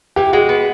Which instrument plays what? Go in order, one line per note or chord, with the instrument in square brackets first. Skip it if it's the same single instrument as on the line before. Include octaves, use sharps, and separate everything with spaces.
[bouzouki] E3 [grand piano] G4
[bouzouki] G#3 [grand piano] F#4
[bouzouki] B3